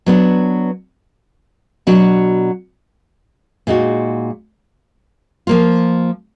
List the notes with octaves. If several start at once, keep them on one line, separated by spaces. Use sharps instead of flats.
F#3 B3 D4
B2 F#3 D4 F#4
A#2 G#3 D#4 F#4
F3 A#3 F4